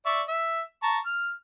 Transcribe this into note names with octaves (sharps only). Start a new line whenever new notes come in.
D5 E5 C#6
E5
A5 A#5 C#6
F6